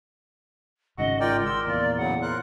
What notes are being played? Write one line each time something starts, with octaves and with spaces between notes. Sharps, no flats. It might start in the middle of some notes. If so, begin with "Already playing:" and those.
G#1 G#2 C#3 F#4 D#5
F4 A#4 D5 G5
C6 E6
E2 A#2 A#3 D5
A2 C#3 F#3 F#5
A#4 C5 F#6